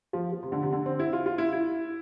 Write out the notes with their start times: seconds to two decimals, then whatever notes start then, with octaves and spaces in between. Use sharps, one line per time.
0.13 F3
0.32 F3
0.43 C3
0.52 D3
0.63 C3
0.73 D3
0.86 C4
0.99 E4
1.13 F4
1.26 F4
1.38 E4
1.53 E4